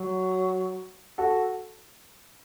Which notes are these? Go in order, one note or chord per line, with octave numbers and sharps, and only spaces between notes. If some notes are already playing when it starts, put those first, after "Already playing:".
Already playing: F#3
F#4 A4